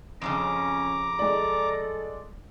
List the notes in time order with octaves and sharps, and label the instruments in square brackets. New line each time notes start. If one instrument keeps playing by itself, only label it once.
[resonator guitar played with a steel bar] F2 A2 C#3 [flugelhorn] C#4 [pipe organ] A#5 D6
[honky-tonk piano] G#3 D5 [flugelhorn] A4